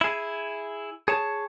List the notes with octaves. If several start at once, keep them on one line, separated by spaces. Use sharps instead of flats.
E4 G#4
G#4 C#5 A5